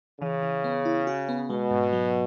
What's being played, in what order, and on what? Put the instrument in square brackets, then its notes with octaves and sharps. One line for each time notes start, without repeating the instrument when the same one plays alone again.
[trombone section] C#3 [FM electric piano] E3
[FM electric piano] E3
B3
E4
F#4
B3
[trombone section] B2 [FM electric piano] G#3
[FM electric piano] G#2
F#3